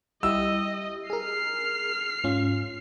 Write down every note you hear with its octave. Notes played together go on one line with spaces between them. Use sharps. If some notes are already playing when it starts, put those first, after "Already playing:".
G3 E4 G4 D#5 E6
G#4 A#4 F6 C7
G#2 C#4 F4